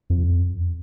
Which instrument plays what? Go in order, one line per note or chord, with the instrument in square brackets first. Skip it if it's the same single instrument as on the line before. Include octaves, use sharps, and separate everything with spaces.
[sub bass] F2